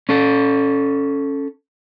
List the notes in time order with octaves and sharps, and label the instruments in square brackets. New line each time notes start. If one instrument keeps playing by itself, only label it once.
[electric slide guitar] C#4 A4